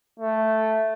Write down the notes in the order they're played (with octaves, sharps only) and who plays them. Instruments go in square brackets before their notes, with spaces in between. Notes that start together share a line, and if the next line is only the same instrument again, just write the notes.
[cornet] A3